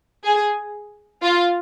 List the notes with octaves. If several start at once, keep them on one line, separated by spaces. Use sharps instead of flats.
G#4
F4